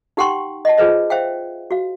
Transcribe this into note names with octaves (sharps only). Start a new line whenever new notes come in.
D#4 G4 F#5 G5 C6 C#6
D#5 F#5 A5
F4 G#4 B4 C5 D#5
C5 E5 F5 G5
F#4 F5